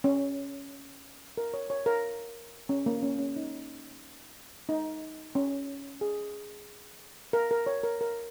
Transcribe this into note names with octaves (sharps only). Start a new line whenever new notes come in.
C#4
A#4
C#5
C#5
A#4
C#4
A#3
C#4
C#4
D#4
D#4
C#4
G#4
A#4
A#4
C#5
A#4
A#4